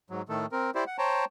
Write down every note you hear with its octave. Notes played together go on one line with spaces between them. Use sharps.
G#2 F#3
A2 D#3 A3 A4
C4 A#4
E4 G4 C5 D5
F#5
C5 C#5 G5 A5 A#5